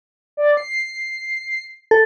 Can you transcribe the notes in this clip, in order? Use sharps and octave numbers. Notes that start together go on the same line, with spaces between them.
D5
C7
A4